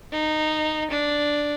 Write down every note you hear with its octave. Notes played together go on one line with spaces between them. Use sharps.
D#4
D4